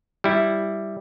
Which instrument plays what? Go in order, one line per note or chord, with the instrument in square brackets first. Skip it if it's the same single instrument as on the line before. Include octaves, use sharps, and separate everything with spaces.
[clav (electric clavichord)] G3 E4